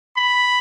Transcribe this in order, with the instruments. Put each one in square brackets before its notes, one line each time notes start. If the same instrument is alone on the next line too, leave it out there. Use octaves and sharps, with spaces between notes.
[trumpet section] B5